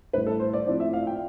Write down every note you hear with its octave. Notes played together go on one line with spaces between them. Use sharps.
A1 A2 G3 B4
A4
C5
D5
A2 F3 C4 E4 D5
E5
F5
G5